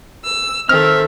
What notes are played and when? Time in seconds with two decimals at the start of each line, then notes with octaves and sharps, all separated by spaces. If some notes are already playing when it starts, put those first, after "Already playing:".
0.24 E6
0.69 D#3 C4 A4 E5 F6